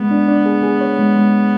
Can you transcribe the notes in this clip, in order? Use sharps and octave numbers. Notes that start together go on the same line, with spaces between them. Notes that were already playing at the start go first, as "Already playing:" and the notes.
Already playing: G#3 B3
D4
D4
G#4
G#4
C#5
G#3
G#3